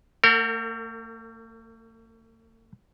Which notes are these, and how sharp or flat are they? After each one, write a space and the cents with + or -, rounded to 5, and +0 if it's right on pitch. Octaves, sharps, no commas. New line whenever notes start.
A3 +45 A#4 -30 F#5 +0